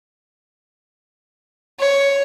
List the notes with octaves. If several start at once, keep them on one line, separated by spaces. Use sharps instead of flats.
C#5